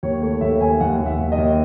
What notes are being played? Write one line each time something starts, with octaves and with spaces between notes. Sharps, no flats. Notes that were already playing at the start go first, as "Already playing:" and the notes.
D#2 C#5
A3 C#5
D#2 E5
D#2 G#5
D#2 F#5
D#2
E5
D#2
D#5
D#2